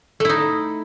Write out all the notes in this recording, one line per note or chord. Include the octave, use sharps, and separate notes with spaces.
A3 D#4 E4